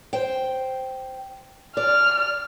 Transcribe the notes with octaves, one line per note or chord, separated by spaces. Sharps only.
C5 G5
D5 F6